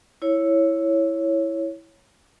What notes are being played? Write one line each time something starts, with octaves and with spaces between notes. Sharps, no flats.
E4 C#5